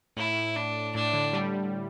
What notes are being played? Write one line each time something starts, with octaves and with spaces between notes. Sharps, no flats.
A2 E4
D4
A2 D4
D3
G3